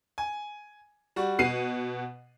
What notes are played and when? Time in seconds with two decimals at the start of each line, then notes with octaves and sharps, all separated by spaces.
0.18 G#5
1.16 G3 F#4
1.39 B2 F#5 C7 D#7